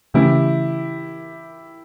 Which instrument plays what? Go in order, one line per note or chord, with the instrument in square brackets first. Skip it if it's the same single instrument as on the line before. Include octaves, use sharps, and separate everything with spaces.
[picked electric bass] C#3 E3 A3 C#4 [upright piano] E4 G4